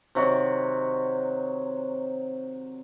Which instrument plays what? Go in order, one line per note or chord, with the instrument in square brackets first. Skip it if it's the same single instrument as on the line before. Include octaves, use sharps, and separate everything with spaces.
[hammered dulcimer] C3 D#3 F#3